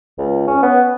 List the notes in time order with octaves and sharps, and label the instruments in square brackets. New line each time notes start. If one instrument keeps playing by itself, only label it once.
[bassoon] C#2
C#4
B3